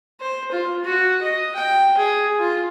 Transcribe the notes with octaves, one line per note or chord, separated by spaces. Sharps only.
C5
F4
F#4
D#5
G5
G#4
F4